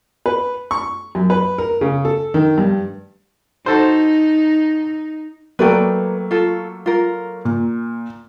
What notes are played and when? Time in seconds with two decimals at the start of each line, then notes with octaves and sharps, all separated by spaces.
0.26 B4
0.71 C#6
1.15 F#2
1.30 B4
1.58 A#4
1.81 C#3
2.05 A4
2.34 D#3
2.58 G2
3.66 D#4 F#4 A4 C5
5.59 F#3 A3 A#3 B4 D5 G5
6.31 F4 A4
6.86 F4 A#4
7.45 A#2